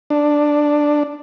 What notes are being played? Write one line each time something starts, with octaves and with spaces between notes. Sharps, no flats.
D4